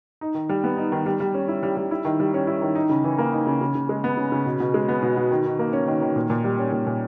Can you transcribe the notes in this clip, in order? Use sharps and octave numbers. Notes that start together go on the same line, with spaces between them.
D#4
D#3
G3
B3
D#4
D#3
G3
G3
C#4
E4
G3
G3
E4
D#3
G3
C#4
E4
D#3
D#4
C#3
E3
A#3
D#4
C#3
C#3
C#3
G#3
B3
C#3
C#3
B2
B2
G#3
B3
B2
B2
D#3
D#3
A#3
C#4
D#3
D#3
A#2
A#2
G3
C#4
A#2
A#2